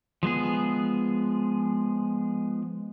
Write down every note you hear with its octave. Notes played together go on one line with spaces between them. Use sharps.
F3 G#3 B3 G#4